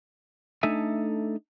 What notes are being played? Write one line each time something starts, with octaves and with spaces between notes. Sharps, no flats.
A3 D4 D#4 A4 E5 G#5